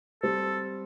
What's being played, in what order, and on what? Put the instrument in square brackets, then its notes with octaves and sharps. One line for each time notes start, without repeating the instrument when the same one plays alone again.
[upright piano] G3 C4 [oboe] A4